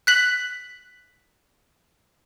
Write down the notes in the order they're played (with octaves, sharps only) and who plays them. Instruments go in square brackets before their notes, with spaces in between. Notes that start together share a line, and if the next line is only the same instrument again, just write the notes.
[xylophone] F#6 B6 F#7